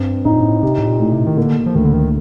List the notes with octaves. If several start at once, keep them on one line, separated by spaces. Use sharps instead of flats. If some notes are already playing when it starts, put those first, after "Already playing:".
Already playing: G2 C4
A2 D#4
A#2
A2
C3 G4
A2
A#2
A2
C3
D#3
D3 A#3
F3
D2 D#3
D3
D#3